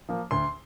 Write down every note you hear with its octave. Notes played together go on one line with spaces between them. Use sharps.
F3 A#3
D2 C6